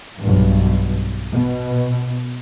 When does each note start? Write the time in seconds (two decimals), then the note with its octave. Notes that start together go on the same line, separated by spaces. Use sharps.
0.20 B1 G2
1.32 B2